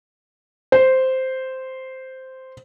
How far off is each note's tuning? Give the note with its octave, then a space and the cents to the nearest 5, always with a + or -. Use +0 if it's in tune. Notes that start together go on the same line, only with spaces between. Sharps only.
C5 -5